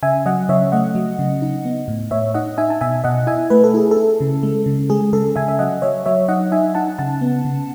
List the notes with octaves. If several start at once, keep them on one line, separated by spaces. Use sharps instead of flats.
C#3 E5 G#5
F#3 D#5 F#5
C#3 C#5 E5
A3 D#5 F#5
F#3
C#3
D#4
B3
A2
A2 C#5 E5
D#4 D#5 F#5
D#4 E5 G#5
A5
B2 E5 G#5
B2 D#5 F#5
E4 E5 G#5
A3 B4
A4
E4 G#4
A4
E4
C#3
G#3
C#3
G#3 G#4
C#3 A4
C#3 E5 G#5
E5
F#3 D#5 F#5
F#3 C#5 E5
F#3 C#5 E5
D#4 D#5 F#5
D#4 E5 G#5
D#4 F#5 A5
C#3 F#5 A5
B3
C#3